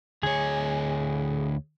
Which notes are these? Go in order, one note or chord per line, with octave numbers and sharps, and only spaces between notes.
D2 G#4 C#5